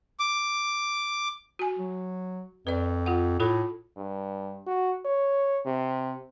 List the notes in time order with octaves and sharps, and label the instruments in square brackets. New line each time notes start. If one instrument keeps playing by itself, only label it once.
[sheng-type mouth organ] D6
[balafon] F#4 G#5
[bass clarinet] F#3
[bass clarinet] F2 [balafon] B4 D5
[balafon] F4 F#5
[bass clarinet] A2 [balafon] F4 A4 B5
[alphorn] G2
F#4
C#5
C3